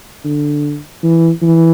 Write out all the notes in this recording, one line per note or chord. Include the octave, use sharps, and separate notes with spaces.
D3
E3
E3